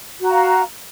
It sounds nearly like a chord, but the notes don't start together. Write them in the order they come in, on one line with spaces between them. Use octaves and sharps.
F#4 A#5 F5